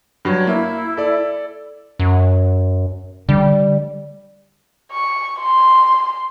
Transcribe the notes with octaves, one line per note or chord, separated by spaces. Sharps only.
G2 F#3 C#5
A#3 E4 E5
A4 D5
F#2
D3 G3
C#6
C6